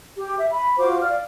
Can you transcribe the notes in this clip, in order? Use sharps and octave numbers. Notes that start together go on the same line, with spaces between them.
G4
E5
B5
F4 F#4 C5 D6
D5 F5 F6